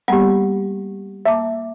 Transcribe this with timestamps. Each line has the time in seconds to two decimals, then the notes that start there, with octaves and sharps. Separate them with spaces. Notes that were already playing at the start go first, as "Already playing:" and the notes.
0.08 G3 A#3 B3 G4 F#5
1.26 A#3 E5 A5 D6